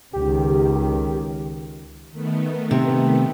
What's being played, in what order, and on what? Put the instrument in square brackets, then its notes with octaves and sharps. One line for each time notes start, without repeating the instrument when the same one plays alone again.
[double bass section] C#2 D#3 [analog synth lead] G4
[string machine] D#3 A3 B3
[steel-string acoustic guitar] C3